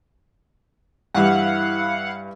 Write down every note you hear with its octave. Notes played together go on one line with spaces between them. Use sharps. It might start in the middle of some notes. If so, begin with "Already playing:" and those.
G2 E3 G3 E4 F5 F#5